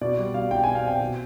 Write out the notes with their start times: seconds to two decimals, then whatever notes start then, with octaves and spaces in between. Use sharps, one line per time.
0.01 B2 D5
0.18 G3
0.34 B2 F5
0.51 B2 G5
0.64 B2 G#5
0.75 F5
0.84 C4 G5
1.00 B2